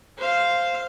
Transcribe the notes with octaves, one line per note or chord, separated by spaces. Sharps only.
C5 F5